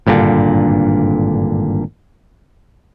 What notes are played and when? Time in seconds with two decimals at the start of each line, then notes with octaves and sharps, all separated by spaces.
0.06 G#1 G2 A#2 D3